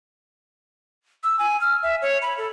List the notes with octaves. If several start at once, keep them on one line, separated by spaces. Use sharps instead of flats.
E6
G#5
F6
E5
C#5
B5
A4